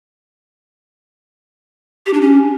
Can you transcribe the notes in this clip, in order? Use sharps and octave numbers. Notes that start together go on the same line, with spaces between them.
G4
D4
C#4